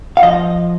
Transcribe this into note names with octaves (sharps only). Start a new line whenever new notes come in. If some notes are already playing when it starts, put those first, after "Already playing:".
F5
F3 D#5